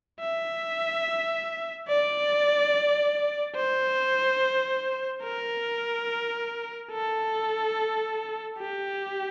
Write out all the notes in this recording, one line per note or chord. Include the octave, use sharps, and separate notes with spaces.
E5
D5
C5
A#4
A4
G4